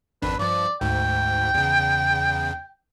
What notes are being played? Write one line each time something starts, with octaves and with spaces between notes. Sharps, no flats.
G#1 F2 D4 B4
G2 F3 D5
D2 G#2 G5
E2 C#3